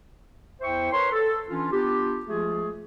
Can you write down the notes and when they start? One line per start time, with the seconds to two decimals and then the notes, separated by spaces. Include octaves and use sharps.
0.61 E2 E4 C5 E5 G5 C#6
0.92 A#4 B4 C#5 C6
1.12 A4
1.49 E3 C#4 D4 F4
1.72 B3 D4 F4 G4
2.26 F3 G#3 A3 F4 G#4